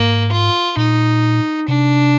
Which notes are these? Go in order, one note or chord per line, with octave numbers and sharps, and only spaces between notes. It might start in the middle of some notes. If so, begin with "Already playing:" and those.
Already playing: G#2 A#3
F4
A#2 D#4
C3 D4